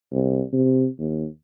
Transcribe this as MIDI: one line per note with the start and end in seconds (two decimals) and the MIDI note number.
0.12 0.43 36
0.53 0.86 48
0.99 1.27 39